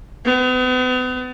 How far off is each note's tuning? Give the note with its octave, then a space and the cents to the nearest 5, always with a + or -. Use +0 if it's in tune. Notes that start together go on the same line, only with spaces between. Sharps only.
B3 +40